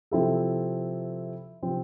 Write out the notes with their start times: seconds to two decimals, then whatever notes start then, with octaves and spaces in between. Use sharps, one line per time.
0.11 C3 F3 C4 E4 A4
1.63 C3 F3 C4